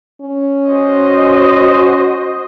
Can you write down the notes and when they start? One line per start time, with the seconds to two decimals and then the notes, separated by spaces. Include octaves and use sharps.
0.21 C#4
0.69 F#4 C5 D#5